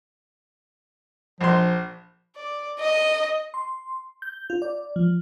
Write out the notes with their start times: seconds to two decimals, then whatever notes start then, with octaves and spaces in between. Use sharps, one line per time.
1.41 A#1 F3 C6
2.36 D5
2.79 D#5
3.54 C6
4.22 G6
4.50 F4
4.62 D5
4.96 F3